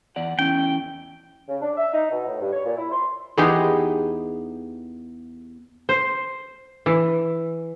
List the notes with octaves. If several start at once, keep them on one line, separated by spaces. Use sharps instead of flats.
E2 D5 F#5
E2 C#4 E4 G5
C#3
D4
E5
D#4
B2
A2
G2
C#5
A#2
E4
C6
E2 B3 D#4 G4 G#4 C6
C5
E3